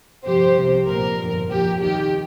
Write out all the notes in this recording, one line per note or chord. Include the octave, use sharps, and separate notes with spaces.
G1 F2 C3 F3 G4 C5
C2 C3 F3
A#1 A#2 F3 A#4
G1 F2 F3
C2 A#2 F3 G4
D#2 D#3 G4